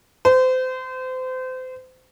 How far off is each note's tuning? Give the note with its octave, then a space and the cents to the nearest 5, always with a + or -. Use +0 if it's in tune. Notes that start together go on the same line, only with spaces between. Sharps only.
C5 -30